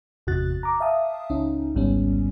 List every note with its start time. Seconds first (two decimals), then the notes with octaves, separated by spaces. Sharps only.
0.27 G1 E2 C3 F#4 F#6 A6
0.63 A#5 D6
0.80 E5 F5 G5 A5 D#6
1.30 C#2 C#4 D#4
1.75 G#1 C#2 G#2 G3 B3 C#4